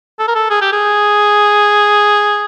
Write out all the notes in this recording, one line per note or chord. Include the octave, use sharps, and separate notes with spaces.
A4
A#4
A4
G#4
G4
G#4